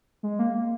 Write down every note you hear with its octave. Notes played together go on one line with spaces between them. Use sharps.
G#3
A#3
A#3